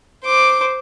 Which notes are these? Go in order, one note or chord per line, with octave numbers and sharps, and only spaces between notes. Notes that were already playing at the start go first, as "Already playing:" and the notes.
C5 D6